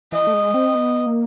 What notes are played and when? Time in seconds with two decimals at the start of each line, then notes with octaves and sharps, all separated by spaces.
0.12 E3 D#5
0.27 A3
0.33 G#3
0.54 C4
0.75 B3
1.06 A#3